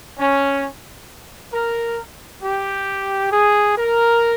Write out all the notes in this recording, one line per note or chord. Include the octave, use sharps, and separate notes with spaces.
C#4
A#4
G4
G#4
A#4